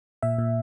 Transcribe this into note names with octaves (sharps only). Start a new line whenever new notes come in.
A#2 E5
A#2